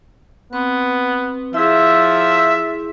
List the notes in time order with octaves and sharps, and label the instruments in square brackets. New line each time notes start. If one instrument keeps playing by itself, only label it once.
[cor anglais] B3 [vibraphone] C4 B4
[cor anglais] F3 [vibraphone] E4 G#4 [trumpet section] E5